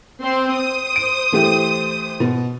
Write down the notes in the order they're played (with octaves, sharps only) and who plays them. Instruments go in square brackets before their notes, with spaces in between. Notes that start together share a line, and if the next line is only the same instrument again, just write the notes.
[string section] C4 C5 C6
C5 D#6
[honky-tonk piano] D7
E3 A3 G4
B2